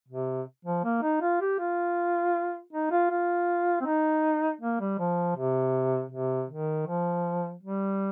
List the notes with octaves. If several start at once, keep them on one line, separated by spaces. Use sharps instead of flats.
C3
F3
A#3
D#4
F4
G4
F4
D#4
F4
F4
C4
D#4
A#3
G3
F3
C3
C3
D#3
F3
G3